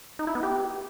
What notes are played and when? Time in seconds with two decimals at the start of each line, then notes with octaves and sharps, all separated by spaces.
0.19 D#4
0.27 E4
0.35 B3
0.43 G4